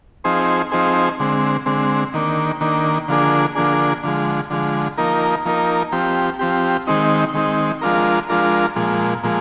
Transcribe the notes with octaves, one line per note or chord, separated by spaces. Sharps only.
F3 C4 D#4 G#4 C5
F3 C4 D#4 G#4 C5
D3 G#3 C4
D3 G#3 C4
D#3 A#3 D4
D#3 A#3 D4
D3 F3 A#3 D4 G#4
D3 F3 A#3 D4 G#4
D3 F3 G#3
D3 F3 G#3
F3 A#3 D#4 A#4
F3 A#3 D#4 A#4
F3 C4 G4
F3 C4 G4
D#3 G#3 C4 D#4
D#3 G#3 C4 D#4
F3 G#3 D4 F4 A#4
F3 G#3 D4 F4 A#4
A#2 F3 G#3
A#2 F3 G#3